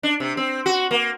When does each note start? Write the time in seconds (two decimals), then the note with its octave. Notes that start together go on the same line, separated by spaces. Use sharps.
0.03 D4
0.20 C3
0.37 C4
0.66 F#4
0.91 A#3